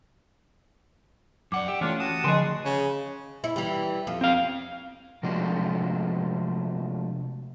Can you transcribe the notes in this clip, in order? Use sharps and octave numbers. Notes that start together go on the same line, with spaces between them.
F#2 D5 F#5 D6
G4 E5
E3 A3 C#4 D4 F4
F#4 A5 D#6
D3 F3 G4 G#4 D#5 G#5 C6 F#6
C#3
E4
E3 G3
F2
C4 F5
C3 F3 G#3 A3 D4 F#4